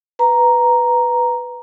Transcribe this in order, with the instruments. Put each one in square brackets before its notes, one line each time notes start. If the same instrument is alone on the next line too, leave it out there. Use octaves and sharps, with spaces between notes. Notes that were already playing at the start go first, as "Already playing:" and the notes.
[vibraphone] B4 A#5